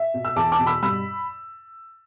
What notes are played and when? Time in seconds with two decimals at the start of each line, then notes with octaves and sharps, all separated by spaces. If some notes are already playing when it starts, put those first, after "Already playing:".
Already playing: E5
0.14 B2
0.25 E6
0.36 E2 A5 D6
0.52 A5 D6
0.59 B2
0.67 B5 E6
0.83 G2 B5 E6